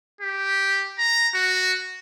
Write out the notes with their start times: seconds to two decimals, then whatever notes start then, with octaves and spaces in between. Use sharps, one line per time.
0.21 G4
0.99 A#5
1.34 F#4